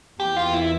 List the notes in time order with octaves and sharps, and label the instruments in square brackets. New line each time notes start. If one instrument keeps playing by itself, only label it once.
[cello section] E2 E3 A#3 [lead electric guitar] G4
[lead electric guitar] F4
E4